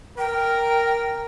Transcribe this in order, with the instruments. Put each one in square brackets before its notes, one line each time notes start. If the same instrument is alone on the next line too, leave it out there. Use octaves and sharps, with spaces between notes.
[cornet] A#4 [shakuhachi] G5